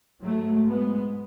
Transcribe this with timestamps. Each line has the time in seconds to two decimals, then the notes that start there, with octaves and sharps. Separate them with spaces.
0.21 G#2 F#3 A3
0.66 G#3 B3